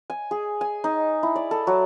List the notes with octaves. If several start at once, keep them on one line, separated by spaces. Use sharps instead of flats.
G#5
G#4
G#5
D#4
E4
D5
A4
F#3